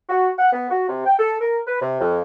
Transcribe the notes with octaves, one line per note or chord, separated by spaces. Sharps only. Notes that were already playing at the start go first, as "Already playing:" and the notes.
F#4
F#5
B3
F#4
C3
G5
A4
A#4
B4
C3
F2